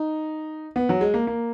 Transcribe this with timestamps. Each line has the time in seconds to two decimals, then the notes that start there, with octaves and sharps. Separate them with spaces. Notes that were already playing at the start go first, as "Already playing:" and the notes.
Already playing: D#4
0.76 B3
0.89 F#3
1.01 G#3
1.14 A#3
1.27 A#3